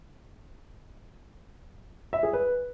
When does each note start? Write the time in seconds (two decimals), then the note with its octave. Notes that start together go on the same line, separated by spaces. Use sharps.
2.13 E5
2.23 G#4
2.33 B4